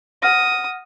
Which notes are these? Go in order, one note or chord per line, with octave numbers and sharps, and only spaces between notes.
F#5 D#6 F6 A#6